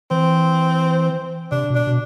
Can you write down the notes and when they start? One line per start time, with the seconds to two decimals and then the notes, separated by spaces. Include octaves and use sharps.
0.11 E3 C4
1.52 C3 D4
1.70 B2
1.75 D4
1.87 B2